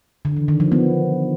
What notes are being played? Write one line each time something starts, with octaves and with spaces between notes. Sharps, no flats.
D3
E3
D#3
F3
B3